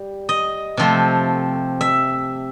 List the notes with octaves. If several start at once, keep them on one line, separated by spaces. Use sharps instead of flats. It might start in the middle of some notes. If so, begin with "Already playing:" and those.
Already playing: G3
D#5
C3 F3 A3 C4
E5